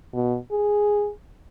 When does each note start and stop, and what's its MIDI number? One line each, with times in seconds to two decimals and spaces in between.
0.13 0.36 47
0.51 1.10 68